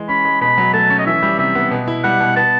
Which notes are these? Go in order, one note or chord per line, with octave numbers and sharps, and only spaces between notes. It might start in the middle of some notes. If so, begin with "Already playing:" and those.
Already playing: E3 G#3
C#4 B5
G#3
B2 B5
F#3
A3 A5
C#4
D#5
E3 E5
G3
C3 E5
B3
B2
E4
G3 F#5
B2
B3 A5